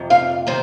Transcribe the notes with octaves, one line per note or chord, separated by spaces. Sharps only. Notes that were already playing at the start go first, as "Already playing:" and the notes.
Already playing: F2 C3
F5
C3 D#3 A#3 C5